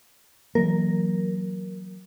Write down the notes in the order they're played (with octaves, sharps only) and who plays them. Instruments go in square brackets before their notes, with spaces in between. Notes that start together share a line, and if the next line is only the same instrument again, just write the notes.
[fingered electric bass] E3 F#3 A#3 [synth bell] A#4